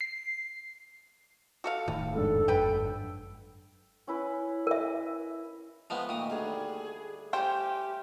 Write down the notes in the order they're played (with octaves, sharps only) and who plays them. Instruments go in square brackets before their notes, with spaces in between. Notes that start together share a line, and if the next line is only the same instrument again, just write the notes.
[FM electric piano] C7
[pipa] F#4 A4 F5
[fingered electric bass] D#1 A2 D#3 [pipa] F4
[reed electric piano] F2 G#2 D4 [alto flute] A4
[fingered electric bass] G1 F#2 [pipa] B4 G5
[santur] C#4 E4 B4
[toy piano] A#4 E5
[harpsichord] F3 G#3 B3 [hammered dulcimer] A3 G5 C#6
[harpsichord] A#2 D#6 [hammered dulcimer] D#3 F#4 C#6
[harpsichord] D2 [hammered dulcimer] G3 D4 [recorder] G#4
[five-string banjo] C#4 C5 G5 [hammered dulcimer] E4 [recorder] G4